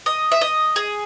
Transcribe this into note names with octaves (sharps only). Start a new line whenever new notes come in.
D#5
E5
D#5
G#4